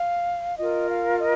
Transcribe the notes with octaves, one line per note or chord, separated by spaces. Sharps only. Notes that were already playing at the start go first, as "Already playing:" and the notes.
Already playing: F5
F4 A#4 D#5
F5
D#5